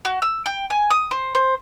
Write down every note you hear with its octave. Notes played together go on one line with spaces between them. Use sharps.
F#4
E6
G5
G#5
D#6
C5
C5